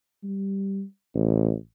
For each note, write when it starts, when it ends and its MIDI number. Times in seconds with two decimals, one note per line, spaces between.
0.23 0.83 55
1.14 1.54 33